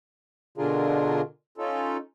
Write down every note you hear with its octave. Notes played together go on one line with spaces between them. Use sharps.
B2 D3 D4 F4 G#4 A#4
C#4 D#4 F4 A4